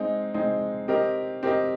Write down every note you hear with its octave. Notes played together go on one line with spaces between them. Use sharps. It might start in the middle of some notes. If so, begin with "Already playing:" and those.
Already playing: G#3 C4 D#4 G#4
G#3 C4 D#4 G#4
C4 G4 A#4 D#5
C4 G4 A#4 D#5